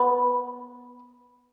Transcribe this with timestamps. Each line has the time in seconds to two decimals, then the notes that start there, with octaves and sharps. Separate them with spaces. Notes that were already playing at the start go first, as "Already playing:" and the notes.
Already playing: B3 B4